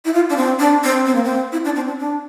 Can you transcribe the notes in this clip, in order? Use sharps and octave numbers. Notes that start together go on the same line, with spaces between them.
E4
F4
D4
C4
D4
C4
C4
A#3
C4
E4
D4
C4
D4
D4